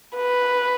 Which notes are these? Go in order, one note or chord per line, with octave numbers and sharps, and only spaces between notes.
B4